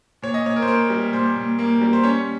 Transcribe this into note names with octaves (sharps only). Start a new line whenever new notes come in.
A#2 C#5
D#5
A#2 C#5
A#4
C5
A#3 A#4
G3
A#2 C5
A#2
A#3
G3
C5
C#4 C#5